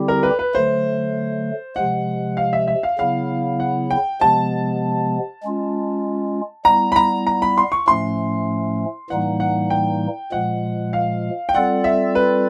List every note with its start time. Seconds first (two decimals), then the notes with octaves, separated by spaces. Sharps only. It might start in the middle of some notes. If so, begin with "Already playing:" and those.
Already playing: D3 G3 C4 E4 G4
0.08 A#4
0.23 B4
0.39 B4
0.55 D3 F#3 A3 C5
1.76 C3 F3 G#3 F#5
2.37 F5
2.53 E5
2.67 E5
2.83 F5
2.99 C#3 F#3 B3 E4 F5
3.60 F#5
3.91 G5
4.21 C3 F3 G#3 B3 A5
5.43 G#3 C#4 F4
6.65 G3 B3 E4 A#5
6.92 B5
6.96 A#5
7.27 A#5
7.42 B5
7.58 C6
7.72 C#6
7.87 A2 F3 A3 C#4 C6
9.10 A2 E3 G3 A#3 D#4 F#5
9.40 F#5
9.70 G5
10.32 A#2 F3 G#3 F#5
10.93 F5
11.49 G5
11.54 G3 C4 F4 A4 D5 F#5
11.84 E5
12.15 B4